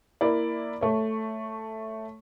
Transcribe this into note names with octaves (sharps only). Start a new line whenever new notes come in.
A#3 E4 A#4 D5
A3 C#5